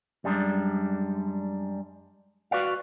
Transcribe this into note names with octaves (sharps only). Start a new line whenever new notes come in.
F#2 G3 G#3 D4
F#4 B4 D5 F5